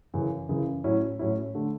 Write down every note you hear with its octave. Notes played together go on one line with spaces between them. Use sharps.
F#2 C#3 E3
F#2 C#3 E3
A2 F#3 C#4 E4
A2 F#3 C#4 E4
D3 A3